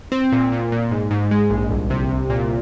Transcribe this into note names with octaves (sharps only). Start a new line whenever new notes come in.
C4
A#2
A#2
A#2
G#2
G#2
G#3
A#1
C2
C3
C2
A#2